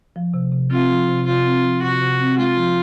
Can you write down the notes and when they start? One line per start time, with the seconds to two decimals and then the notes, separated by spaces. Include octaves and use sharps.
0.16 F3
0.34 C3
0.52 C3
0.71 C4 F4
0.90 F3
1.09 C3
1.26 C3 F4
1.46 C4
1.64 F3
1.82 C3 F#4
2.01 C3
2.20 C4
2.38 G#3 F4
2.57 F3